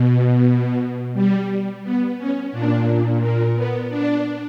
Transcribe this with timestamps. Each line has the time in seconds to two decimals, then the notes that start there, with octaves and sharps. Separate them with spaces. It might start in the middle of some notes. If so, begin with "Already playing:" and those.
Already playing: B2
1.14 G3
1.83 B3
2.18 C#4
2.51 A#2 D4
3.20 A#3
3.55 B3
3.89 D4